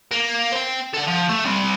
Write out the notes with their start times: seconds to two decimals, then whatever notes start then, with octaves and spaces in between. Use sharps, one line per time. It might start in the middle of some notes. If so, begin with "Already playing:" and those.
0.11 A#3
0.52 C5 G5
0.94 A4 F#5
1.08 F3
1.29 A3
1.45 G3 C4